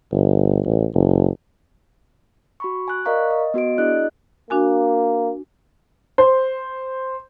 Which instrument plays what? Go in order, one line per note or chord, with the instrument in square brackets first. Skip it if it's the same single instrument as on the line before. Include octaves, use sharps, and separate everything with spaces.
[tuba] G1
A1
F#1
[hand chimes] F#4 B5 C#6
G#5 F#6
A#4 D5 D#5 F5 A#5 C#6
D#5
B3 F#4 D#5 D7
D4 E4 G#4 D5 D#5 F#6
[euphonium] A#3 [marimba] D4 F#4 G#5
[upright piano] C5